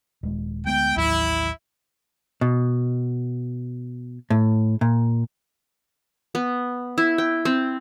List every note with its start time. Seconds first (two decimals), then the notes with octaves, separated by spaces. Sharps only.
0.23 D#1 G#3
0.66 D2 G#3 B3 G5
0.96 A1 D#2 F#3 E4
2.41 B2
4.30 A2
4.81 A#2
6.35 B3
6.98 E4
7.18 G5
7.45 C4